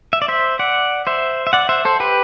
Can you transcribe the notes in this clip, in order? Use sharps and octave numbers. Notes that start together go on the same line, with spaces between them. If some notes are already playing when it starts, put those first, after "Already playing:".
E5
D5
C5 E5
D5 F#5
C5 E5
E5
D5 F#5
C5 E5
A4 C5
G4 B4